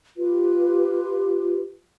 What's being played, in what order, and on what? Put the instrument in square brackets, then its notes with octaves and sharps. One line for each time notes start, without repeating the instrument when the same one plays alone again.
[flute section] F4 G4 B4